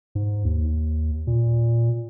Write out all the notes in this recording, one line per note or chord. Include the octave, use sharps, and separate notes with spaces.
G#2
D#2
A#2